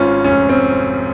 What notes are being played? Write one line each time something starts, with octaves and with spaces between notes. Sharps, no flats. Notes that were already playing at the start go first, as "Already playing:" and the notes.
Already playing: G#1 G#2 C#4 F4
F1 C#4
C4